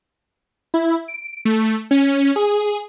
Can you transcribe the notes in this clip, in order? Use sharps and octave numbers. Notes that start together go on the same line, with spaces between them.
E4
D7
A3
C#4
G#4